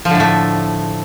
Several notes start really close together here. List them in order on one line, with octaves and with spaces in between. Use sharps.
F3 D3 A2 A3